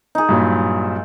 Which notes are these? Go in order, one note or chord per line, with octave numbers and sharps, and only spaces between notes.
D#4 G#4
G2 A#2 F#3